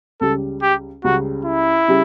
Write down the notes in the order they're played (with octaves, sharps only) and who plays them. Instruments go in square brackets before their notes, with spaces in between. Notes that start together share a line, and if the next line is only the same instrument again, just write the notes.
[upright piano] C#2 C#3 G3 [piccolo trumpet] A4
[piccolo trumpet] G4
[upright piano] C#2 C#3 G3 [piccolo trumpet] F#4
[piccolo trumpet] E4
[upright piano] C#3 G3